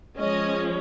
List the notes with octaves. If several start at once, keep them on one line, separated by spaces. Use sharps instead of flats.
F3 G#3 C#4 D#5